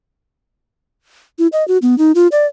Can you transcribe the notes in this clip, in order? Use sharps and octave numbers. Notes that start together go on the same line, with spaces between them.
E4
D#5
F#4
B3
D#4
F4
D5